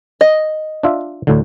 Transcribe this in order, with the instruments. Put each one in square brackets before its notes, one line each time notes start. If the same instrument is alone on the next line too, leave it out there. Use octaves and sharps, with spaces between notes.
[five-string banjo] D#5
[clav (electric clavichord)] D4 F4 E5
D2 A2 D3